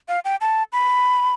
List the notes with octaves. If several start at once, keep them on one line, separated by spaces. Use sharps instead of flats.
F5
G5
A5
B5